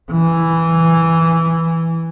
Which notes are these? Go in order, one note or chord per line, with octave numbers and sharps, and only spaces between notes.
E3